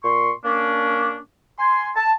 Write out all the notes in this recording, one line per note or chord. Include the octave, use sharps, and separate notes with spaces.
A#2 C6 C#6
A#3 C#4 D4
G#5 C6
A5